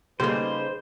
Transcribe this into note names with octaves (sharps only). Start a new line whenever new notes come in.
C#3 G3 A3 A#3 D#4 G#4 B4 C5